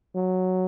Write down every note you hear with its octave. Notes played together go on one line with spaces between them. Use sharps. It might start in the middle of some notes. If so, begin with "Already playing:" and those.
F#3